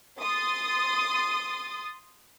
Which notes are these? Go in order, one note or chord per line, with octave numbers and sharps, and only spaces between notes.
C6 D#6 A6